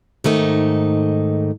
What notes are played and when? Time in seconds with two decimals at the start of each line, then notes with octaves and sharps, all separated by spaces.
0.24 G#2 D#3 A3 D#4